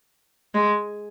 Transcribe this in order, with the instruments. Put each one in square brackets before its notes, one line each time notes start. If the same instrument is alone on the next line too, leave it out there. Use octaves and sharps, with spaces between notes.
[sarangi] G#3